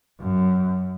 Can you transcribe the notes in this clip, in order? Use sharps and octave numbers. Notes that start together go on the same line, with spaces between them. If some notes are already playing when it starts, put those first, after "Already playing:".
F#2